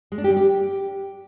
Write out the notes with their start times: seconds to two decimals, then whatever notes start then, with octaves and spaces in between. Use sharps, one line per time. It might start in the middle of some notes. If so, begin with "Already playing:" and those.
0.12 G#3
0.18 D4
0.24 G4
0.30 G3
0.37 G4